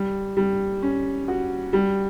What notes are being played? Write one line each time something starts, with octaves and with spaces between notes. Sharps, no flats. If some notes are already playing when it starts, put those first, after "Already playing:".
Already playing: G3
G3
C#4
F#4
G3